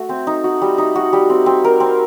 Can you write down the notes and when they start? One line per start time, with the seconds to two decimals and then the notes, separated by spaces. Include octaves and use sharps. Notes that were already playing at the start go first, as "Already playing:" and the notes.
Already playing: A3 F#4
0.09 C4
0.27 D#4
0.44 F#4
0.62 G3
0.78 D#4
0.96 F#4
1.13 G3
1.30 C4
1.46 C4
1.64 A#4
1.80 C4